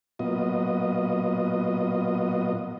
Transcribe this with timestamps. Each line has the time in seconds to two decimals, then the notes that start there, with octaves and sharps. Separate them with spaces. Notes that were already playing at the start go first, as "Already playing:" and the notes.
0.19 A#2 F#3 B3 F4 D#5